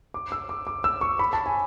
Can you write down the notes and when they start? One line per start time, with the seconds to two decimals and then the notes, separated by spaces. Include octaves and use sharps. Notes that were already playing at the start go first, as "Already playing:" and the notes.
0.14 D6
0.32 E6
0.49 D6
0.67 D6
0.84 E6
1.01 C#6
1.19 B5
1.33 A5
1.46 G#5